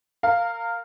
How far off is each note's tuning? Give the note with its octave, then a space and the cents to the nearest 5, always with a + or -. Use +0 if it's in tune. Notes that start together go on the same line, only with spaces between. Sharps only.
A#4 -30 F5 +0